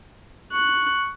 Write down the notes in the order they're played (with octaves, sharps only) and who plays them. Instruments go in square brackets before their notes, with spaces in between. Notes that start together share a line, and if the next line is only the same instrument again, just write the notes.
[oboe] C#6 [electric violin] F#6